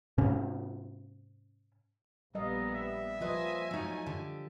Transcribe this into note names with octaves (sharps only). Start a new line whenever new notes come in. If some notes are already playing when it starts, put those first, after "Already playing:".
G#2 C3 C#4
A#1 G3 B3 A4 D#5 F5 A#5
E5
F3 A#3 B4 C5 D#5 G#5
F#3 A3 C#4 D#4
D3 G4